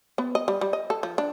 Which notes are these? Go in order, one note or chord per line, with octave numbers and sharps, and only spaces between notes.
B3
D#5
G3
G3
D#5
A4
F3
D4